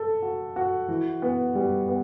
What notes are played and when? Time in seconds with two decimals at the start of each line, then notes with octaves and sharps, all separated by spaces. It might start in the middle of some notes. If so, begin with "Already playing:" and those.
Already playing: A4
0.22 F#4
0.56 F#4
0.88 E3
1.22 B3
1.55 G3
1.88 B3